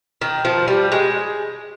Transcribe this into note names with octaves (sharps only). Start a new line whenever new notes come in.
D#3
F3
G3
G#3